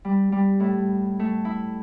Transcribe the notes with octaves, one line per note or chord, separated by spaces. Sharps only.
G3
G3
A2
A3
E4